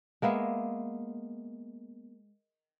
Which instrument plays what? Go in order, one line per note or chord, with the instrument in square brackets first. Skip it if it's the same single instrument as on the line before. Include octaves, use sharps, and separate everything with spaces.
[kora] G#3 A#3 B3 E5